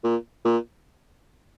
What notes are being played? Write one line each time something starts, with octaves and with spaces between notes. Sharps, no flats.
A#2
A#2